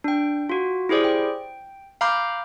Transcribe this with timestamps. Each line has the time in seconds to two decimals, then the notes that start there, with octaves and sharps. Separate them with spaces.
0.04 D4 G5
0.49 F4 F#4
0.89 E4 G4 G#4 C5 D5
1.04 G5
2.01 F5 A#5 B5 D6 F6 G6